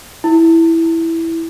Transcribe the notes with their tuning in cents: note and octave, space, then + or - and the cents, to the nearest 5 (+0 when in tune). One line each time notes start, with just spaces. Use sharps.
E4 +0